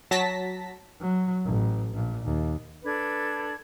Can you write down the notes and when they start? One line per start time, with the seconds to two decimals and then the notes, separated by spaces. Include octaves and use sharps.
0.11 F#3 A5 A#6 B6
1.00 F#3
1.45 A1
1.94 A#1 A#2
2.25 D#2
2.83 D4 A4 B4 G#6